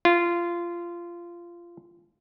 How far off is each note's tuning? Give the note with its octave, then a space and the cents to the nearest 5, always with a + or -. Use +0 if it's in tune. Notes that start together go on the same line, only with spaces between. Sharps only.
F4 -20